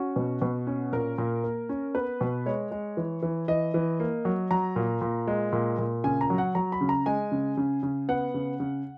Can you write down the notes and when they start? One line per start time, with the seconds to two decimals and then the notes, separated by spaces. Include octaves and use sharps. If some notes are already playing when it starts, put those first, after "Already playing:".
Already playing: C#4 F#4
0.16 B2
0.42 B2
0.67 C#4
0.92 A#2 A#4
1.18 A#2
1.44 A#3
1.69 C#4
1.95 B3 B4
2.21 B2
2.46 G#3 C#5
2.71 G#3
2.97 E3
3.23 E3
3.48 E3 D#5
3.74 E3
4.00 A#3
4.25 F#3
4.51 F#3 A#5
4.76 A#2
5.01 A#2
5.27 G#3
5.53 A#2
5.78 A#2
6.04 C#3 G#5
6.21 A#5
6.30 F#3
6.38 F#5
6.55 F#3 A#5
6.72 B5
6.81 C#3
6.89 A#5
7.06 G#3 G#5
7.32 C#3
7.57 C#3
7.83 C#3
8.09 B3 F#5
8.34 C#3
8.60 C#3